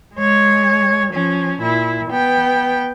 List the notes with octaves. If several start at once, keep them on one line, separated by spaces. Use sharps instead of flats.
G#3 C#5
F3 C#4
A#2 E4
B3 G5